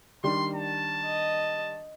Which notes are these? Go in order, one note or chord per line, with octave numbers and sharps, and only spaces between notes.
D#3 G3 D4 C6
A5
D#5